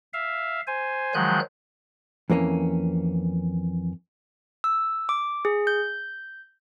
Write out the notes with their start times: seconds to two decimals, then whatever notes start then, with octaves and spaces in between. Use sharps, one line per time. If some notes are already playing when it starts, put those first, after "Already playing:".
0.13 E5 F5
0.67 C5 G#5
1.14 D#3 F3 F#3 G#3 F#6 G6
2.30 F2 E3 A#3 C#4
4.64 E6
5.09 D6
5.45 G#4
5.67 G6